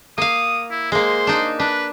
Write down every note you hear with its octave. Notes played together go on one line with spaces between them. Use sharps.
A#3 F5 D#6
E4
G#3 A#3 C5
D4 D#4
D4 B4